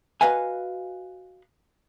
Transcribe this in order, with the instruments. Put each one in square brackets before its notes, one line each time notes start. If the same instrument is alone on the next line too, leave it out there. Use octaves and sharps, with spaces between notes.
[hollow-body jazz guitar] F#4 B4 D#5 F5 F#5 G#5